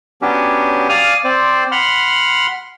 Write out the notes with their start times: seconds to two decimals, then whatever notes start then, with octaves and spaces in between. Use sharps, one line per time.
0.22 F#3 B3 C#4 D4 G4
0.89 D5 F5 G#5 D#6 F6
1.24 C4 C5 D5
1.72 F#5 B5 C6 F6